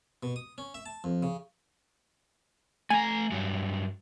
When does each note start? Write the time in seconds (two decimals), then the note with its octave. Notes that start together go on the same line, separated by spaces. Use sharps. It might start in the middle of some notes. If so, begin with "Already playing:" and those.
0.23 B2
0.36 D#6
0.58 C#4
0.74 E5
0.86 A5
1.04 F2
1.23 C#3
2.90 A3 G#5 A#5
3.32 G2 F#3